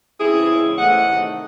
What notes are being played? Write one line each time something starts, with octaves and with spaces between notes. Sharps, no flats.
C#3 E3 C4 E4 G#4
E2 C#3 G#3
A2 E3 A3 C4 D#5 F#5
C3 D#3 A3